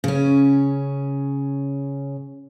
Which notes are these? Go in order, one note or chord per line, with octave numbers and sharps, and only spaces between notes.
C#3 C#4